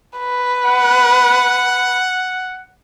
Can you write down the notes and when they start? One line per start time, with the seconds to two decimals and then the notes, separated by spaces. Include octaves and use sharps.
0.19 B4
0.66 F#5